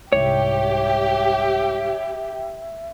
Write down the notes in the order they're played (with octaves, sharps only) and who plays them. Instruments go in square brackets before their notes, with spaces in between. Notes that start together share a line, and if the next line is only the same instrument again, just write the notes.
[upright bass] C2 G#2 [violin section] G4 [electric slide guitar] C#5 [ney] E5